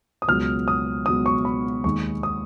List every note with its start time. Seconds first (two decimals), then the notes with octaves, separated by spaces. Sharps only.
0.22 D#6
0.28 C#2 B2 F#3 F6
0.68 D#6
1.06 C#2 B2 F#3 D#6
1.26 C#6
1.45 B5
1.84 D#2 D#3 G#3 C#6
2.23 D#6